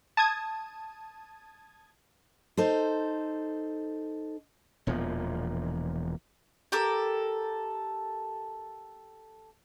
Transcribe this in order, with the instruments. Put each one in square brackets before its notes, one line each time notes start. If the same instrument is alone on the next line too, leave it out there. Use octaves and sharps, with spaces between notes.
[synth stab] A5 D#6 G#6
[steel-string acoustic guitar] D#4 A4 C5
[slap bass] E1 E2 A#2 F3
[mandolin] G4 A4 A#4